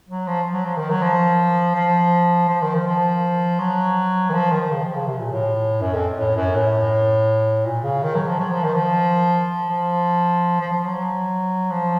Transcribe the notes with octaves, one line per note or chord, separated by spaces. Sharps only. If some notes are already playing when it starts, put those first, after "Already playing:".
F#3
F3
F#3
F3
D#3
F#3
F3
F3
F3
D#3
F3
F3
F#3
D#3
F3
D#3
C#3
F3
C#3
C3
A#2
A2
F#2
F2
A2
F#2
A2
A#2
C#3
D#3
F#3
F3
F#3
F3
D#3
F3
F3
F3
F3
F#3
F3